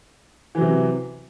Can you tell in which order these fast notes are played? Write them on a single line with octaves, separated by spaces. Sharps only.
E3 F#3 C3